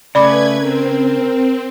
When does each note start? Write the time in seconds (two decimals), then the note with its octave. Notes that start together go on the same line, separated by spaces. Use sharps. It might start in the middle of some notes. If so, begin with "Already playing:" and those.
0.15 C#3 A3 B4 D5 B5 D6 G#6
0.61 C4 A#4